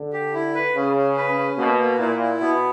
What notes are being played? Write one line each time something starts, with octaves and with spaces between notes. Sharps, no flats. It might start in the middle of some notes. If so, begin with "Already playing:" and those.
Already playing: D3
G4
E4
B4
C#3 C#4
C#4
B4
C#4
B2 A#3
A#3
A#2 E4
E4
B2 B3